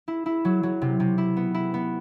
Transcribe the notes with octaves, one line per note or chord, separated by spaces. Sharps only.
E4
E4
F#3
F#3
C3
C3
E4
B3
E4
B3